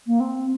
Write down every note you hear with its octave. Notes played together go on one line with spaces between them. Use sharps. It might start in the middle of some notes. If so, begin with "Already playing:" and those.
A#3
C4